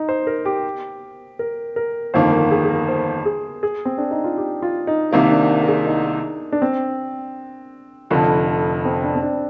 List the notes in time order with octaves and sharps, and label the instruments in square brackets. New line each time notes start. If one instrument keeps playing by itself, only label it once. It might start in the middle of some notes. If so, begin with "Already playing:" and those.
Already playing: [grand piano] D#4
C5
A#4
G4
A#4
A#4
[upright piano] G1 F2 D#3 A#3 [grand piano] C5
[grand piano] A#4
G#4
G#4
A#4
C5
G#4
G#4
C4
D4
D#4
F4
G4
F4
D#4
[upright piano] C2 C3 D#3 A#3 [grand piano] D#4
[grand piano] D4
A#4
G#4
D#4
D4
C4
[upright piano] F1 F2 D3 F3
[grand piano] C4
D4
C4
D4